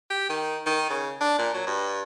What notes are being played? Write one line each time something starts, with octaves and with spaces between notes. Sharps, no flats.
G4
D#3
D#3
C#3
D4
A#2
F#3
G2